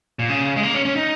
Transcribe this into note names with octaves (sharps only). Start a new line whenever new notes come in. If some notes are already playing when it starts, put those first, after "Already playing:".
A#2
C#3
G#3
A#3
C#4
C#4
D#4